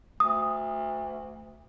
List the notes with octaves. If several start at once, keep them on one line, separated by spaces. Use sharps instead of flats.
D2 D#6